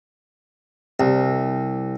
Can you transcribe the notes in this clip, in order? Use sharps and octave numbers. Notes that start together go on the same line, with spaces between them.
C2